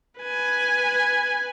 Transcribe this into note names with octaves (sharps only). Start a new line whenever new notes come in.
B4 G#5